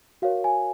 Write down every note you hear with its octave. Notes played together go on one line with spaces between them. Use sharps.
F#4 A#4 C#5 F5
G#5